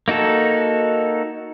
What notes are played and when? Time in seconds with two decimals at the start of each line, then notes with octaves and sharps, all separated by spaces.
0.08 A#3 D#4 F#4 A4